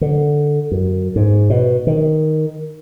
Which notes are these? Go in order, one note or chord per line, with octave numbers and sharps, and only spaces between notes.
D3
F#2
G#2
B2
D#3